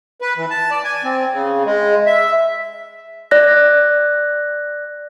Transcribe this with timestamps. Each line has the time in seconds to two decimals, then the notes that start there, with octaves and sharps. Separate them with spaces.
0.21 B4
0.37 E3
0.51 A5
0.71 D5
0.84 G#5
1.04 C4
1.33 C#3
1.66 G#3
2.06 E5
3.31 D5 F#6 A#6